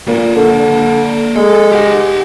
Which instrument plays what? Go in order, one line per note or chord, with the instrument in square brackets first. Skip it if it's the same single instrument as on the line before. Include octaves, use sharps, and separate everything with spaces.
[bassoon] A#2 [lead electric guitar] A#3 B4
[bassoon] D3
[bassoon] G#3 [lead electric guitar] A4
[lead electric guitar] G4 F#5